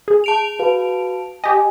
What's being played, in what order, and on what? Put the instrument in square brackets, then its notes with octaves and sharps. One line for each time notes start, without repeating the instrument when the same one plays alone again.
[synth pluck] G#4
[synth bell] A5 D7 F7
[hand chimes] F#4 B4 F5
[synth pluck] G4 D#5 [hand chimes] G#5